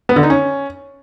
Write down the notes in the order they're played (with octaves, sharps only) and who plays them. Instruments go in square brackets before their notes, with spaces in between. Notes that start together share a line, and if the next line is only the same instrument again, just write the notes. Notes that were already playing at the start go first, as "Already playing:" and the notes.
[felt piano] B3
D3
D#4
C#4